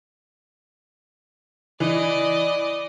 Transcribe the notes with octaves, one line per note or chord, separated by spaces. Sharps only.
E3 D5 D#5